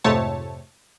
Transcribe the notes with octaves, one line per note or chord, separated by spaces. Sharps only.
F2 G#2 C3 A3 C#5 A5